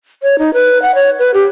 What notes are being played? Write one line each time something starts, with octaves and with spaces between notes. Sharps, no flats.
C#5
D#4
B4
F#5
C#5
B4
G4